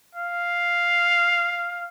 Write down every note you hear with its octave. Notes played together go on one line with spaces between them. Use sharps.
F5